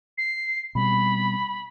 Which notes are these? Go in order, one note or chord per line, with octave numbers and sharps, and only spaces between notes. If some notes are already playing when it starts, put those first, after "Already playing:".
C7
B2 G3 C4 B5